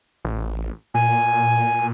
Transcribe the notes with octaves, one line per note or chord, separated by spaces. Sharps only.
A1
A#2 G#5